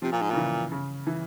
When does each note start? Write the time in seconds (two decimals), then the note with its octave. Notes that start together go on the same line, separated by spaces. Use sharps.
0.02 C3 F3
0.12 A#2
0.22 G#2
0.30 A#2 C#3
0.37 E3
0.72 C#3
1.07 E3